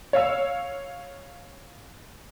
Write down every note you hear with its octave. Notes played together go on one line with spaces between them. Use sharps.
C#5 F5 E6